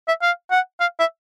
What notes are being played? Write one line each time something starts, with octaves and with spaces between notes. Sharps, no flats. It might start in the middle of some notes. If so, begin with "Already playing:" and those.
E5
F5
F#5
F5
E5